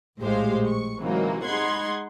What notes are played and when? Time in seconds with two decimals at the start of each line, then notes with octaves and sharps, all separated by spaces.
0.20 A#1 A2 G#3 G4 C5 F5
0.67 C#6
1.00 C3 E3 F#3 G#3 A#3 D#4
1.47 G#3 D#4 F#5 B5 C6 G#6